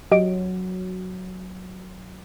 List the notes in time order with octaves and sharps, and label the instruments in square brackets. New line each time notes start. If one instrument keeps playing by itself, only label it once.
[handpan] F#3 [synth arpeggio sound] G4 D#5 D7